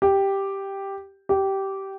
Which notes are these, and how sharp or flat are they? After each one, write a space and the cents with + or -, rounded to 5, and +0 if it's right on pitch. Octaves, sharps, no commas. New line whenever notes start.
G4 +0
G4 -15